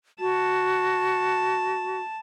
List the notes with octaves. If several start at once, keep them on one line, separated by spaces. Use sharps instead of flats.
F#4 A5